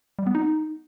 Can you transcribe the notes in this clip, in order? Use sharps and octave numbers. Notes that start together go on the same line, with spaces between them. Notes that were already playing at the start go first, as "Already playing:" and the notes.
G3
B3
D#4